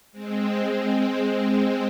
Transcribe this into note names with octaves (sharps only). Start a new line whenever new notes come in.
G#3 C4